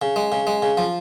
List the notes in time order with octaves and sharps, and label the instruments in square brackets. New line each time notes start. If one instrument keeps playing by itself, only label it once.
[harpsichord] C#3
G#3
C#3
G#3
C#3
F3